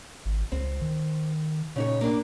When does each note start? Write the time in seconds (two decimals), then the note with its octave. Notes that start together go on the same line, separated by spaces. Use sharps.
0.25 G#1
0.52 C#2 C4
0.81 D#3
1.76 A#2 C#3 D#4 C#5
2.01 A#3 D4